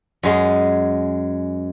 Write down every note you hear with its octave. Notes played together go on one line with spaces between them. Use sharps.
F#2 G#3 G#4